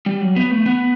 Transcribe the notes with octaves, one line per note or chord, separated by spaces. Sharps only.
G3
F#3
B3
A3
B3